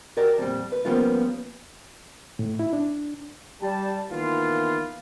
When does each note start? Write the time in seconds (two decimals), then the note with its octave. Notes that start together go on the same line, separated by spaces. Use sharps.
0.17 F#4 G4 A#4 D5
0.38 F2 A#2 G3
0.72 B4
0.85 F3 G3 A#3 B3 C#4 F4
2.39 A2
2.59 E4
2.73 D4
3.62 G3 A5
4.10 D#3 E3 A#3 B3 F4